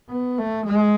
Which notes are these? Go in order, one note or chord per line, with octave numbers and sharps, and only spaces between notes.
B3
A3
G#3